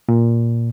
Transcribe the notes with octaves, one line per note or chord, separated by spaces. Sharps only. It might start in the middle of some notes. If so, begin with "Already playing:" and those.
A#2